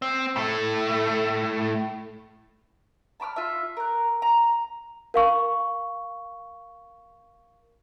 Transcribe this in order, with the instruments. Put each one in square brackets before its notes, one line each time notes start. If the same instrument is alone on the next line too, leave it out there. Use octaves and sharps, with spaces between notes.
[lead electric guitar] C4
A2 A3
[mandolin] A5 B5 D6 F6
F4 E5
A#4 F#6
A#5
[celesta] A#4 F5 C#6